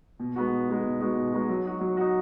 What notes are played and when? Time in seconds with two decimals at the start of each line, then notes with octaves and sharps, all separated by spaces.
0.20 B2
0.35 G#3 B3 D#4 F#4
0.51 B2
0.69 G#3 B3 D#4 F#4
0.85 B2
1.00 G#3 B3 D#4 F#4
1.17 B2
1.33 G#3 B3 D#4 F#4
1.49 F#3
1.65 D#4 F#4
1.81 F#3
1.97 D#4 F#4